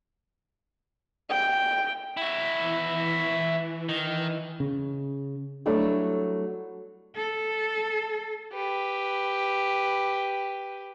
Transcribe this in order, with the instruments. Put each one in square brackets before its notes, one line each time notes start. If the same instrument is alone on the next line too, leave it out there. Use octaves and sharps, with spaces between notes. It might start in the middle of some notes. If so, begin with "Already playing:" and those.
[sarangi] G5
[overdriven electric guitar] E4 F#4
[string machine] E3
[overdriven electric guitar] D#3
[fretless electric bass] C#3
[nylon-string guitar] F#3 G3 A3 D4 E4 F#4
[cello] A4
[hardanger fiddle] G4 B4